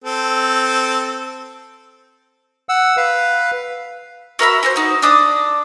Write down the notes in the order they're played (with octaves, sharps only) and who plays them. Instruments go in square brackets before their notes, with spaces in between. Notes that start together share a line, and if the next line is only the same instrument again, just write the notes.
[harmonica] C4 A4
[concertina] F#5 E6
B4 F5
[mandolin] F#4 A#4 E5 B5
F#4 A#4 C5
D#4 F#4
D4 D6 D#6